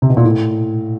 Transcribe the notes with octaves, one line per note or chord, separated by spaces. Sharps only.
C3
B2
A#2
A2